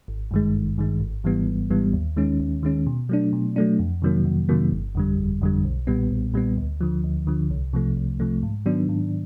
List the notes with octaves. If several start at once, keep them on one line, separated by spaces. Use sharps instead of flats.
G#1
G2 D#3 G#3
G#1
G2 D#3 G#3
G#1
G#2 E3 G3 B3
G#1
G#2 E3 G3 B3
D#2
D#3 G#3 C#4
D#2
D#3 G#3 C#4
B2
F#3 A3 D4
B2
F#3 A3 D4
F2
C3 D#3 F#3 A#3
F2
C3 D#3 F#3 A#3
G1
F2 D3 G3
G1
F2 D3 G3
B1
A#2 G3 B3
B1
A#2 G3 B3
D2
D3 F3
D2
D3 F3
C2
C3 F3 A3
C2
C3 F3 A3
G#2
D#3 F#3 B3 D4
G#2